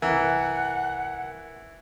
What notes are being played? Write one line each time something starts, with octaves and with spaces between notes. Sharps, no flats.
C2 F#2 E3 A#4 F#5